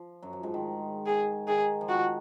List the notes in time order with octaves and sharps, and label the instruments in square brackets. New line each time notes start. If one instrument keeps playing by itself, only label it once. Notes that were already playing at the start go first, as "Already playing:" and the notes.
Already playing: [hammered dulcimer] F3
F#2 F#3
F3
G#2 G#3
D#3
[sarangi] G#4
[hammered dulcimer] D#3 [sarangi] G#4
[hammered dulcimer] F3
[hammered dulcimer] D#3 [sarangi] F#4